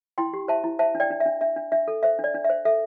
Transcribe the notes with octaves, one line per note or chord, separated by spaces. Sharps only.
E4 G5 C6
G4
C5 E5 A5
E4
C5 E5 A5
D4
D5 G5
D4
E5
D4
D4 E5
D4
D4 E5
A4
C5 E5
D4
D5
D4
E5
C5
A4 E5